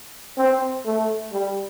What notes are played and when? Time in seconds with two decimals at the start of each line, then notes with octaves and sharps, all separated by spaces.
0.38 C4
0.86 A3
1.32 G3